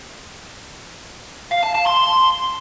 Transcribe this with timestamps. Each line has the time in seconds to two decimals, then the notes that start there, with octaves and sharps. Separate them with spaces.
1.51 F5
1.63 A5
1.74 A5
1.86 C6